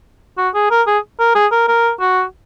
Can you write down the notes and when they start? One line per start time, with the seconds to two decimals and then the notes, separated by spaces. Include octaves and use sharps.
0.37 F#4
0.54 G#4
0.70 A#4
0.87 G#4
1.19 A#4
1.35 G#4
1.52 A#4
1.68 A#4
2.00 F#4